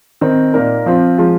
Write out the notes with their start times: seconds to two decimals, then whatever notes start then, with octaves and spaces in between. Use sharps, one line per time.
0.21 D#3 C4 D#4
0.54 A#2 A#3 D#4 A#4
0.86 F3 C4 F4
1.18 F3 G#3 F4